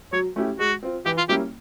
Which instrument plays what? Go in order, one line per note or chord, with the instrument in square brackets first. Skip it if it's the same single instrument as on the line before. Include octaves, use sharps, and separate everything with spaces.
[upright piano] F#3 [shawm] C#5
[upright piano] A3 C#4 E4 G4
[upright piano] G#3 [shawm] F#4
[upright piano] C4 F4
[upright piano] E3 [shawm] G4
[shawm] F4
[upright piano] G3 A#3 C#4 E4 [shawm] G4